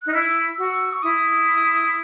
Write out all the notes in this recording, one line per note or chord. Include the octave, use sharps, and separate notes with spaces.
D#4 F#6
E4 E6
F#4
C#6
E4 D#6